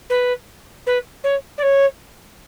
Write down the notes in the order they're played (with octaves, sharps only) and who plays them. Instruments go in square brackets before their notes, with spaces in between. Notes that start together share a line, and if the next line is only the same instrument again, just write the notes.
[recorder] B4
B4
C#5
D5
C#5